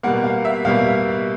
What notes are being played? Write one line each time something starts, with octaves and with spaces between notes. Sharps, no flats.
B2 G3 A#3 F#5
F5
E5
B2 G3 A#3 F5